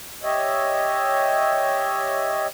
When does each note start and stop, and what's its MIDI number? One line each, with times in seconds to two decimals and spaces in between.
0.23 2.47 67
0.23 2.47 73
0.23 2.47 75
0.23 2.47 76